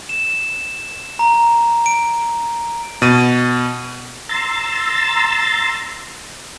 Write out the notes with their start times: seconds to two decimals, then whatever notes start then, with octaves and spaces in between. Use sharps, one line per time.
0.09 E7
1.19 A#5
1.86 D7
3.02 B2 D#7
4.29 A#5 C6 E6 A6